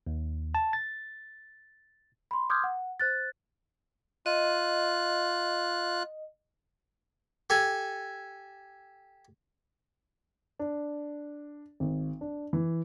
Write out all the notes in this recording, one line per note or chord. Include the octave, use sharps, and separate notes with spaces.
D#2
A5
A6
B5 C6
C6 D6 D#6 F6 G6 G#6
F#5
C5 F#6 A6
F4 D#5 F#6
G4 A4 G#5
D4
G#1
D4
E3